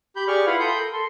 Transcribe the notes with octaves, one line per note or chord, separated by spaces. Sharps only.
G4 B5 G6
G4 G#4 D5 C#6 F6
E4 F4 B4 F5 F#5 B5
A4 G5 B5 C6 D#6 G6
A#4
A4 C6